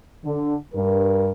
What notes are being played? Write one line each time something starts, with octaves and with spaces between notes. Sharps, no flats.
D3
G2 A#4